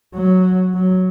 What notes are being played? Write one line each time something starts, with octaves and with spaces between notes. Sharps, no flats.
F#3
F#3